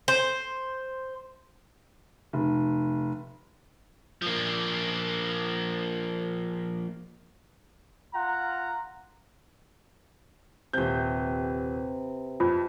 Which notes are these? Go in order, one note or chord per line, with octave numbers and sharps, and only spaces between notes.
C5
F1
F3 A#3
F4 F#5 A#5
D#1 C3 B4 G6
F2 F4